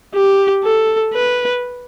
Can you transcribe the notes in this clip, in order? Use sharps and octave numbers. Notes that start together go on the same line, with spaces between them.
G4
A4
B4